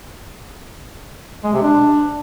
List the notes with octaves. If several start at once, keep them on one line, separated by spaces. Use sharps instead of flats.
G#3
C3
D4